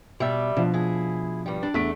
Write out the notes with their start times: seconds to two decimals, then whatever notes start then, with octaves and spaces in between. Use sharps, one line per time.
0.20 B2 G3 D5 E5
0.57 B2 F3 D4
0.73 E4 G#4
1.46 G2 G3
1.63 D4
1.74 E2 A3 B6 D7